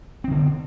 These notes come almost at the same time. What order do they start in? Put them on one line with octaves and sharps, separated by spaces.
C4 D#3 D3 B3